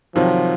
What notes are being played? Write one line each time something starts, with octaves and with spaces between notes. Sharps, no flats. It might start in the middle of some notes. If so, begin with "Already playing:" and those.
C3 D#3 F3 F#3